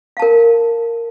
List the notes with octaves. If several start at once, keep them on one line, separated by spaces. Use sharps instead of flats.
A#4 F5 A5